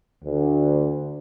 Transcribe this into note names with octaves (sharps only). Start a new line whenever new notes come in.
D2
D3